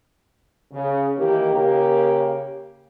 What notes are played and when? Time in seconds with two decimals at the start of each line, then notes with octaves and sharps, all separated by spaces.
0.72 C#3
1.17 D#3 E3 A#3 G4
1.52 C#3 A#3 G4